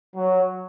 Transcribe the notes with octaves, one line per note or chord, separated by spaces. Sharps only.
F#3